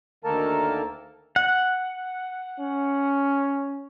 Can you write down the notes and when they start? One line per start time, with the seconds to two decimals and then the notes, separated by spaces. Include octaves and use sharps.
0.24 D2 D#3 A#3 A4 A#4 A5
1.36 F#5
2.59 C#4